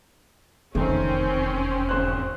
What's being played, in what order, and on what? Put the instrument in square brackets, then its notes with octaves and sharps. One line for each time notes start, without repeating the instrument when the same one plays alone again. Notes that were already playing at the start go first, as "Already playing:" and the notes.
[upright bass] F1 E2 [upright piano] D#3 A3 [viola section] C4 C#4
[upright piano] G#1 C5 F#6